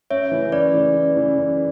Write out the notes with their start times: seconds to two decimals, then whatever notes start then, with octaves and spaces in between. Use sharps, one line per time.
0.10 F#2 C#5 E5
0.31 C#3 E3
0.52 F#2 B4 D5
0.74 C#3 E3
0.95 F#2
1.17 C#3 E3
1.38 F#2